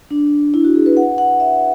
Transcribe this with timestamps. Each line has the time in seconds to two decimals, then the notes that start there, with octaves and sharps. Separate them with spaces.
0.11 D4
0.54 E4
0.64 F#4
0.75 G#4
0.86 B4
0.97 F#5
1.18 F#5
1.40 E5